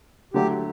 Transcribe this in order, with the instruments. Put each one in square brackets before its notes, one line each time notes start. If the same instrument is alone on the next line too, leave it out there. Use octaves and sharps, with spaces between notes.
[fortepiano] D3 F#3 A3 [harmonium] G4